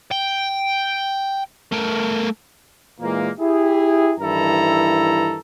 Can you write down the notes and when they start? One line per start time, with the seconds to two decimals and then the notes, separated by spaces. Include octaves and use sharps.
0.11 G5
1.72 A3 A#4
3.00 A#2 E3 G#3 A#3
3.39 E4 G4 G#4
4.19 G2 D#3 E3 E4 A4 A#5